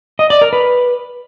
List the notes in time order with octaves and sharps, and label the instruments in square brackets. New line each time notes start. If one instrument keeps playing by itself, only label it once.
[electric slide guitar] D#5
D5
A#4
B4